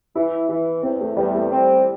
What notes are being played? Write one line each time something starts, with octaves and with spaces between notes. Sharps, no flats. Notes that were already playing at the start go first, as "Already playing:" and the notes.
E3 E4
E3 E4
E2 C4
A3
E2 G3
A3
C4